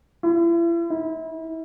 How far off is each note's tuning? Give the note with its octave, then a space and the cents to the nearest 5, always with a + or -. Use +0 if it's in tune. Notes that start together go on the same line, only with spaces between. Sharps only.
E4 +40
E4 -35